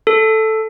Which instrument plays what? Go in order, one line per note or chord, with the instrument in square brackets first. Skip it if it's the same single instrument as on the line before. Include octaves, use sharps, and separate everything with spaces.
[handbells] A4